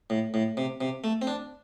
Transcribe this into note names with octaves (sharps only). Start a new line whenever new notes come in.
A2
A2
C3
C3
A3
C4
D4